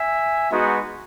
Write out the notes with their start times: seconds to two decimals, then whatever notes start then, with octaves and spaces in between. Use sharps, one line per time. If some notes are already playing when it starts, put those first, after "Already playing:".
Already playing: E5 G#5
0.51 G#3 B3 D#4 F#4